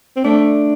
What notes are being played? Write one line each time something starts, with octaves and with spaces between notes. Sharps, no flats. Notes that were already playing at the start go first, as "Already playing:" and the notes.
C4
A3 D4